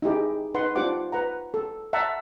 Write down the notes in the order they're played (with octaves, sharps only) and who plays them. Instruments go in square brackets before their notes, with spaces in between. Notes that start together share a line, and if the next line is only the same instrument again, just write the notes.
[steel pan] D#4 E4 G4 G#4
D#4 B4 F#5 C6
D4 F4 G4 C5 F#5 D6
B4 F#5 A#5
A4
E5 F#5 A5 A#5